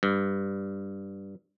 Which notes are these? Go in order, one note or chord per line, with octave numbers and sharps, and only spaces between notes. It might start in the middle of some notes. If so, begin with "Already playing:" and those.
G2